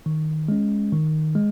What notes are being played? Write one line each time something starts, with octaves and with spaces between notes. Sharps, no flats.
D#3
G#3 C#4
D#3
G#3